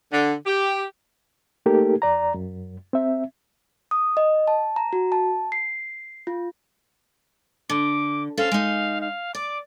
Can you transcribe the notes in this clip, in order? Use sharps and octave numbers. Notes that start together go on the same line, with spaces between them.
D3
G4
A3 A#3 D#4 G4 A4 A#4
F2 D5 A#5
F#2
C4 E5
D#6
D#5
A5
A#5
F#4
A5
C7
F4
D3 D6
C#4 A4 C5 F5
G#3 D#4
F5
D5 D6